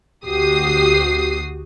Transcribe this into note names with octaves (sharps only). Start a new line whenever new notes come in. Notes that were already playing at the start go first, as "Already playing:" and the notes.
D2 F#4 G4 D#6 C7